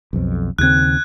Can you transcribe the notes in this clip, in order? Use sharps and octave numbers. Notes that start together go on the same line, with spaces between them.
B1 F2
D#2 C#3 C4 F#6 G#6